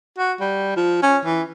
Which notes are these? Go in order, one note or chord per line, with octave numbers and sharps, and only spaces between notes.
F#4
G3
F3
C#4
E3